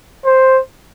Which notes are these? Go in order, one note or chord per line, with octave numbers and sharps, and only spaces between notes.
C5